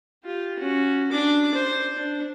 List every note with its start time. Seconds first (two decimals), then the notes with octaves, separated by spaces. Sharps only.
0.23 F4 G4
0.58 C#4 F#4
1.11 D4 D6
1.54 C5
1.96 D4